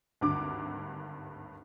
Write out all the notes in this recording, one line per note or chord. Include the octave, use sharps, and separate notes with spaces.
G#1 D2 G2 D6